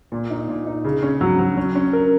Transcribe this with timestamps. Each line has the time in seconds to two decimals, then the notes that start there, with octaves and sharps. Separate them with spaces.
0.12 A#2
0.30 D#4
0.48 A#2
0.66 D#4
0.84 C#3
1.03 C#4
1.21 F#3
1.39 F#3
1.57 C#4
1.75 C#4
1.93 A#4